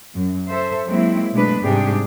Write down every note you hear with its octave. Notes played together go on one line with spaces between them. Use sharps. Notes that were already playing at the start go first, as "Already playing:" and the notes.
F#2
A4 C5 E5
F#3 G#3 A#3 C4 E4
B2 G#3 A3 B3 D4 B4
G#2 C3 G3 D4 G4 G#4